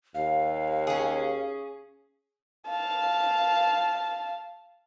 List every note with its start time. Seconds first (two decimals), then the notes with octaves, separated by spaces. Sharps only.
0.15 D#2 F5
0.87 C#4 G#4
2.69 F5 A5